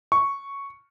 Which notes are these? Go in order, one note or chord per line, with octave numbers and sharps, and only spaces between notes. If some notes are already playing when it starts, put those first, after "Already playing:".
C#6